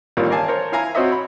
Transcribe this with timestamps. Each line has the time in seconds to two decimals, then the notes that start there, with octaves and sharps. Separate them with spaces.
0.17 A1 D#3 G3 A#3 F4
0.30 A#4 D5 F5 G#5 A5
0.48 A#4 C5 C#5
0.72 E4 F5 G#5 A#5
0.95 C4 F#4 C5 C#5 D#5 E5
1.12 B5